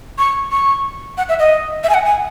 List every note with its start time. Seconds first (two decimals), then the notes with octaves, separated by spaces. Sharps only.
0.19 C#6
0.52 C#6
1.18 F#5
1.29 E5
1.39 D#5
1.84 E5
1.89 G#5
1.94 F#5
2.05 G#5